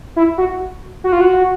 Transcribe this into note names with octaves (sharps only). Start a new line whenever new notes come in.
E4
F#4
F#4
F4
F#4